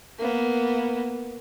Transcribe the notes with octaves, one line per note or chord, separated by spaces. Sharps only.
A#3 B3